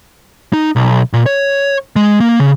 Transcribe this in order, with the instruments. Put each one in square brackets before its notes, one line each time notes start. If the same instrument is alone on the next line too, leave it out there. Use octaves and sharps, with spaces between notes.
[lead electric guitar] D#4
B1
A#2
C#5
G#3
A#3
C#3